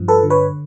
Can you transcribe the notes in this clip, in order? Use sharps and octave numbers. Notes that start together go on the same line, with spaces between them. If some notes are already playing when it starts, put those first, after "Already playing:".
Already playing: G2 F3
A4 B4
D3
B4 C#5